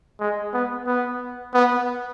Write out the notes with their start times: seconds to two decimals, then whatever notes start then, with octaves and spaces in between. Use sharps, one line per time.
0.20 G#3
0.54 B3
0.87 B3
1.54 B3